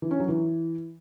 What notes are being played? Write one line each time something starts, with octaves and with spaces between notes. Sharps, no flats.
E3
C#4
F#3
E3